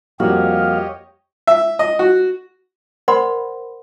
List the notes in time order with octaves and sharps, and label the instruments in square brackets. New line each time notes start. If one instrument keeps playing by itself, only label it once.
[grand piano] F2 G3 A#3 [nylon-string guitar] F#4 [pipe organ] G4 C#5 D#5 [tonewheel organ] F5
[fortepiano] E5
D#5
F#4
[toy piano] A#4 C5 D5 F#5 B5 C6